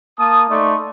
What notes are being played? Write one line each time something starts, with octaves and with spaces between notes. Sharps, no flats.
A#3 A5 D#6
A3 D#4 D5 C6 C#6